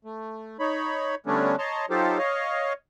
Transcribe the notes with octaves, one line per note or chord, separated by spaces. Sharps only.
A3
D#4 C#5 B5
D3 G3 A3 B3 C#4 D4
C#5 D#5 A5 A#5 C6
F#3 D#4 F4 G4 A4 C5
C#5 D#5 F5